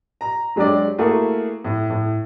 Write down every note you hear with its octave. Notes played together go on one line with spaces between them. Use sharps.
A#5
F#3 G#3 D4 G4 D5
A3 A#3 E4 F#4 G#4
A2
A2